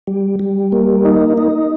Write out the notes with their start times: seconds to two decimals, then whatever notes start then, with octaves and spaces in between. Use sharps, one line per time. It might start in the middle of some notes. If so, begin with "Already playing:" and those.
0.07 G3
0.39 G3
0.72 A#3
1.05 D#4
1.38 D#4